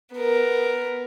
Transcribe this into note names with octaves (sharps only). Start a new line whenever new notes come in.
B3 A#4